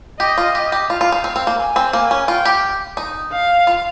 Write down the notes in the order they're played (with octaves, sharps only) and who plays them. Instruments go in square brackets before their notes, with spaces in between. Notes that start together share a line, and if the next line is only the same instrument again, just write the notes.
[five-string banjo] G4 [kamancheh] D#5
[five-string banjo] F4
G4
G4
[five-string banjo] F4 [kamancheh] F5
[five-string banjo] F4
D#4
C4
C4
A#3
[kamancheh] G#5
[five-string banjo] C4
[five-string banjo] A#3 [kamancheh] G#5
[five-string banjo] C#4
[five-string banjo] F4 [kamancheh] G5
[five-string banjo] G4
D#4
[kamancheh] F5
[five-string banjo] F4